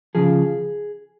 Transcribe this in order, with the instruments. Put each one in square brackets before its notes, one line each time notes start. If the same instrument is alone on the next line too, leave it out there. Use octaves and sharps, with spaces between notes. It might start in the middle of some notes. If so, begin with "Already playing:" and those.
[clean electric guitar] C#3 F3 G#4